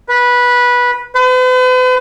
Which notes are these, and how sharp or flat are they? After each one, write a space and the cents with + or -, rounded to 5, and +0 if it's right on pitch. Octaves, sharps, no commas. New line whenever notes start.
B4 -15
B4 +45